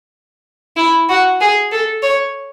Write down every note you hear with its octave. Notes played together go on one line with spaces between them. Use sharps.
E4
F#4
G#4
A4
C#5